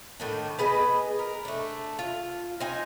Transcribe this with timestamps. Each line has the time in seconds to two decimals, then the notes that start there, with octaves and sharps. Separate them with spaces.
0.20 A2 D#3 D4
0.59 B3 G#4 B4 D#5
1.19 A#4
1.45 A3 D4
1.99 F4
2.60 C4 D#4 G#5